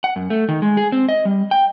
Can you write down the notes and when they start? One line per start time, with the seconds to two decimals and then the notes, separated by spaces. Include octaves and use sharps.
0.04 F#5
0.16 F#2
0.30 A3
0.49 D#3
0.62 G#3
0.77 G#4
0.92 C4
1.09 D#5
1.25 G3
1.51 G5